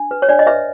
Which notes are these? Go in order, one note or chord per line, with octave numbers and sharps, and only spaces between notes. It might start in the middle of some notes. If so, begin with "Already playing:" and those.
Already playing: D4
B4
C#5
D4 D5
D#5
B4 E5